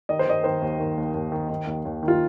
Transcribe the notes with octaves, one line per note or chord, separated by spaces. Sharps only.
D#3 D#5
C5
D#3 D#5
D#3 C5
D#2
D#3
D#2
D#2
D#3
D#3
D#2
D#2
D#3
F4